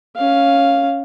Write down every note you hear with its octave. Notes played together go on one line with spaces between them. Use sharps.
C#4 F5